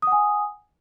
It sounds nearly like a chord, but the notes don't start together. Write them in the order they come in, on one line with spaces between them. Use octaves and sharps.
D#6 F#5 G#5